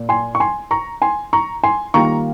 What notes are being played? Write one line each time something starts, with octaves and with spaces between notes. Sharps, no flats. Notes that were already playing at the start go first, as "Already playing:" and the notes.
Already playing: A#2
G#5 C6
C#6
G#5 C6
A#5 C#6
G#5 C6
A#5 C#6
G#5 C6
D#3 G3 A#3 F4 A#5 C#6